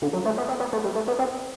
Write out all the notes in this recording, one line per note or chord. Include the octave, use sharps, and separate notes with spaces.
D3
F#3
A3
B3
C4
B3
A3
G3
A3
B3
C4